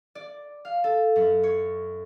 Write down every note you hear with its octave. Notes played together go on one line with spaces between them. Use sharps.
D5
F5
A4
F#2
C#5